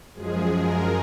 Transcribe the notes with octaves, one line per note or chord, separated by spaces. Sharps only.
F#2 F3 G#3 G#4
A#4